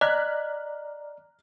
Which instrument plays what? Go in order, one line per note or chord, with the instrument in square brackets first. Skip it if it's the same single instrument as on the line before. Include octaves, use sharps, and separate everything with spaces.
[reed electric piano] D5 A#5 [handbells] D#5 [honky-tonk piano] F6 F#6 B6